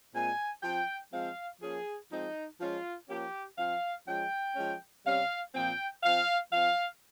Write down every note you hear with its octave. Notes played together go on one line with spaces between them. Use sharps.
A#2 G#3 C4 G#5
F3 C4 G5
F3 G#3 C4 F5
F3 A#3 C#4 G#4
F3 G#3 C4 D#4
F3 G#3 C#4 F4
F3 A#3 C#4 G4
F3 C4 F5
F3 G#3 C#4 G5
F3 G#3 C#4
C3 G3 C#4 F5
A#2 F3 C4 G5
F3 C4 F5
F3 C4 F5